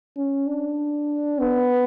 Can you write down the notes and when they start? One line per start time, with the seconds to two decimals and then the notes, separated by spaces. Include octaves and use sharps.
0.17 C#4
0.47 D4
1.40 B3